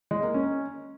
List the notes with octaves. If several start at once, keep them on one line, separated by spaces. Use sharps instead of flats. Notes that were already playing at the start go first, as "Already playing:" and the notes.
G#3
A#3
C#4